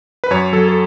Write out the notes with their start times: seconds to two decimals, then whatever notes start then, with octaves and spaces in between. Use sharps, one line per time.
0.24 B4
0.31 F#2 C#5
0.53 F#3 A4
0.68 A4